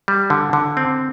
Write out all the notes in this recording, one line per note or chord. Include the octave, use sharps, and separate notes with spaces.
G3
D3
D3
C4